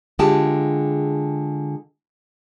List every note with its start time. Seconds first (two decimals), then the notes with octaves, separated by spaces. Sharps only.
0.19 D3 G#3 F4 G4 G#4 A5